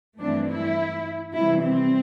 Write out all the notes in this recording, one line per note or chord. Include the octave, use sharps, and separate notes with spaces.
G2 E3 A3 C4 D4
E4
C3 E3 G3 E4
C4